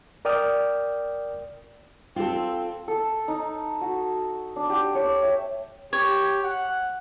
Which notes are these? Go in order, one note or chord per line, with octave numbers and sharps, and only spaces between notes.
A#4 D5 G5 D#6 F6
C4 F4 A4
A4
D#4
F#4
D4
G4
C#5
E5
G4 C#5
F#5